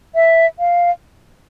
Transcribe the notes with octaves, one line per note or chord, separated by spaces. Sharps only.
E5
F5